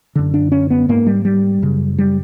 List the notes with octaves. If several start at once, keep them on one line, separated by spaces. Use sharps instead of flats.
F#2 D3
D4
C#4
B3
G#2 A#3
G3
G3
F#2 C#3
G3